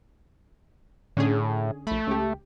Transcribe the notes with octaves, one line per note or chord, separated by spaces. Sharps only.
A2 D3 C#4 G#4
A#1 A3 B5
C#2 G4